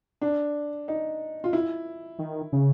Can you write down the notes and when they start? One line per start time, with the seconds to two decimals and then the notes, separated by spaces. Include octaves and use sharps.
0.21 D4
0.88 D#4
1.44 F4
1.53 E4
2.19 D#3
2.53 C#3